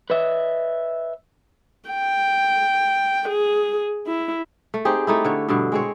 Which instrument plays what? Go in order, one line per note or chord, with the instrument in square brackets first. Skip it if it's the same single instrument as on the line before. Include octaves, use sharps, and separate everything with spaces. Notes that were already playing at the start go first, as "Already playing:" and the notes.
[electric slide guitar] B4 C#5 D#5 E5
[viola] G5
G#4
E4
[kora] A3
C4 D#4 G4 G#4
A3 D#4 E4
D3 C#5
G2 B2 D3
G#3 C4 C#5